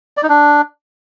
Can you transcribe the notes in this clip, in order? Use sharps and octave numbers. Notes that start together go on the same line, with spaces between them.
D5
D#4
D4